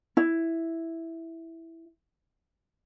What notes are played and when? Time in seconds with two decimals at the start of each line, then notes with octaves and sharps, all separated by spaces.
0.17 E4